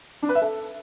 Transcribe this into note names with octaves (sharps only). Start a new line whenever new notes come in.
D4
B4
E5
A4